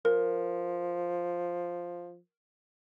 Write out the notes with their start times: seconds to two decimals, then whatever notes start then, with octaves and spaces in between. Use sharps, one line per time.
0.05 F3 A#4